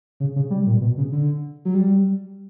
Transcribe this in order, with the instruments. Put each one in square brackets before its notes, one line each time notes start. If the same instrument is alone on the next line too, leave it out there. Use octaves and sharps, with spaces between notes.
[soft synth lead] C#3
C#3
G3
A#2
B2
C#3
D3
F#3
G3